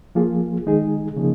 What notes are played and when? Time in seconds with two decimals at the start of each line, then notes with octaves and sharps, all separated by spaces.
0.15 F3 A#3 F4 G#4
0.66 D#3 G#3 D#4 G#4
1.16 C#3 F3 A#3 D#4 G#4